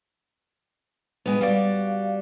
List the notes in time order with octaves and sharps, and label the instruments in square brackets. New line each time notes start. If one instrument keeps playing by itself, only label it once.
[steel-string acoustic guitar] G#3 B3
[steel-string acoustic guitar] G3 F#4 D5 [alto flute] F5